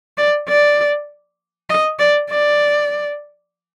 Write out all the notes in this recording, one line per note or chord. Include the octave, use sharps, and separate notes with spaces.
D5
D5
D#5
D5
D5